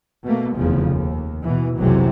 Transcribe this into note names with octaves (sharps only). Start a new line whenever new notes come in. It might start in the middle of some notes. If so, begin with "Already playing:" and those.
B2 A3 A#3
F1 E2 C#3 F3
D#2
B2 E3
F1 B1 C3 E3 F#3 G#3